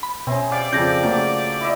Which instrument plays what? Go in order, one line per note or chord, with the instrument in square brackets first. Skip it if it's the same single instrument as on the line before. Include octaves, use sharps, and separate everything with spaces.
[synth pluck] B5
[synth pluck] B2 [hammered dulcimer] C4 G#4 [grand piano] C#4 E5
[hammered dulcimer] G4 F5 G5 [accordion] D5
[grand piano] F2 C#3 [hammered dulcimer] F3 [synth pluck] G6 A#6
[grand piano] C#3 A3 A#3 [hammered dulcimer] F#3 G4
[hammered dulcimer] E4 D#5 E5